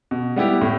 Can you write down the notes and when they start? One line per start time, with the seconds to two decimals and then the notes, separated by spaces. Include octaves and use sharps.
0.11 B2
0.36 G3 B3 E4 G4
0.61 A2